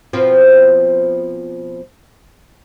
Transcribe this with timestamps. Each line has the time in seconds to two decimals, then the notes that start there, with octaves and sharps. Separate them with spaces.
0.13 B2 F3 C4